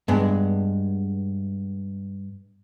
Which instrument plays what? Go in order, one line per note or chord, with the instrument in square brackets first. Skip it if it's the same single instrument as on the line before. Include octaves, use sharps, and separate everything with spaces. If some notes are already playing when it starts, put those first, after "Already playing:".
[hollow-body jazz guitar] G2 G#3 B3